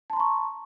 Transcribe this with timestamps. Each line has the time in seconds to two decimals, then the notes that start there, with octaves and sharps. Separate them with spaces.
0.10 A5
0.13 C6
0.16 A#5
0.20 C#6